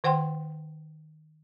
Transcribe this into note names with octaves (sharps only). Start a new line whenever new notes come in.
D#3 C5 F#5 G5 C6